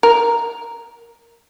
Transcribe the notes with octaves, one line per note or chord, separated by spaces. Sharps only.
A#4